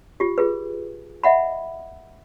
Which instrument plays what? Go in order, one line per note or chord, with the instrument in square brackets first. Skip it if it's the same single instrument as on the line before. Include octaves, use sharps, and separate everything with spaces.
[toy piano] F4 G4
F4 G#4 B4
D#5 E5 F#5 B5